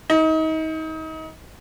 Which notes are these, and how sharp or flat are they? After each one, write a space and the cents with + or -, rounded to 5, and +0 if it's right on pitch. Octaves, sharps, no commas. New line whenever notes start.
D#4 +30